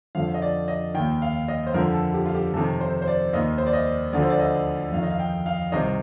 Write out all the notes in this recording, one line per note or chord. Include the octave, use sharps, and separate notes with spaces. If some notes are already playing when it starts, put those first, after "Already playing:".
F2 D3 F3 F5
D#5
D5
D#5
D#2 D#3 G5
F5
D#5
C5
F2 D3 F3 A#4
A4
G4
F4
G4
F2 C3 D#3 A4
C5
C5
D5
D#2 D#3 D#5
C5
D5
D#5
D2 D3 F3 D5
C5
D5
D#5
F2 D#3 F5
D#5
F5
G5
F5
C2 C3 D#3 D#5